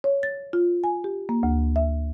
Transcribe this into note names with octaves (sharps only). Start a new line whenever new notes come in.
C#5
A6
F4
G#5
G4
A#3
D2
E5